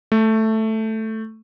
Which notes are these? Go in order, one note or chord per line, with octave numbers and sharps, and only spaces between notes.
A3